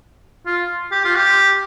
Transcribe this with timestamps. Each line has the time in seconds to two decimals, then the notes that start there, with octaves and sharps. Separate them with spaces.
0.46 F4
0.91 G4
1.04 F4
1.15 G4